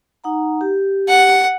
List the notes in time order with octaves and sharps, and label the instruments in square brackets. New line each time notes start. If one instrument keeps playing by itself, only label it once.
[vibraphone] D#4 F#5 A#5
G4
[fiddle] F#5